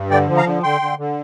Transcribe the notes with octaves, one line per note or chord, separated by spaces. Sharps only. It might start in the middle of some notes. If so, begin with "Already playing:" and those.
Already playing: G2
D3 D5 G5
F3
F5 A#5
D3
D3 G5 C6
D3
D3